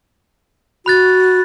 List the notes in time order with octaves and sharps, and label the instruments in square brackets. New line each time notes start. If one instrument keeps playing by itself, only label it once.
[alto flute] F#4 [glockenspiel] B5 F#6 A6